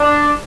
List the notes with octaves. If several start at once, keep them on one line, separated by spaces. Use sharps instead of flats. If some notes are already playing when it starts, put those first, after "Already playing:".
Already playing: D4